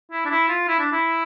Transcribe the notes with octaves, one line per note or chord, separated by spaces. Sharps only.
E4
D4
E4
F4
E4
D4
E4